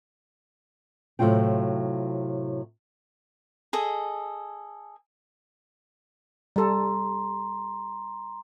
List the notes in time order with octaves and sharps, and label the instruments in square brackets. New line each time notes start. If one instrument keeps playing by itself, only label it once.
[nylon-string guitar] A2 C3 F#3 F4 G5
[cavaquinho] G#4 A4 D#5
[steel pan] G3 A4 [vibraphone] A#5 C6